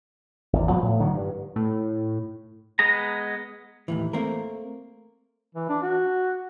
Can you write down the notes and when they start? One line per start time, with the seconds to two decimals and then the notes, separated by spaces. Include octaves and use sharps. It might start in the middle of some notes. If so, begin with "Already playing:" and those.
0.53 G#1 E2
0.70 F3 G3 B3
0.82 A2
0.99 D3 D#3 F3 F#3
1.14 G2
1.56 A2
2.79 G#3 B3 G#4 A#5
3.88 D#2 A2 E3
4.13 A3 A#3 C4 A#4
5.55 E3
5.69 D4
5.82 F#4